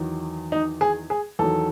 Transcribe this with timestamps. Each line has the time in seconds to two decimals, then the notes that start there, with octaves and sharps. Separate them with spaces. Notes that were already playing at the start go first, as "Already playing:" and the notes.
Already playing: E2 D#3 F#3
0.52 D#4
0.81 G#4
1.10 G#4
1.39 E2 D#3 F#3 A4